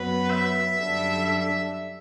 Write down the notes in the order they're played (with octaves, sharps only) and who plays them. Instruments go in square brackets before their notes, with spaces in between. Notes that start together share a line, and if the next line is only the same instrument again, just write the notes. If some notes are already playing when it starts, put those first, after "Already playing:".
Already playing: [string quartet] F#2 F#3 B3 [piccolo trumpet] B4
[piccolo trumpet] E5
[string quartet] F#2 D3 G3 D4
[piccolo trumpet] E5